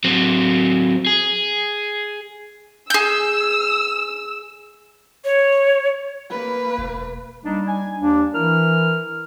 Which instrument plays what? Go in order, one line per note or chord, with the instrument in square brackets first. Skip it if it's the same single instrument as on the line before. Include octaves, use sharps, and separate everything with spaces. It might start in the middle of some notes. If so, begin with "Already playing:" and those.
[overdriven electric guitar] F#3 C4
G#4
[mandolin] G#4 G6 [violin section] E6
[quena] C#5
[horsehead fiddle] A#3 B4
[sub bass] E1
[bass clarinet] G3 [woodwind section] A#3 D4 D#4
[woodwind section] G#5
[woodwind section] D#2 [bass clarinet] D4
[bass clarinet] E3 [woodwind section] E4 A#4 F6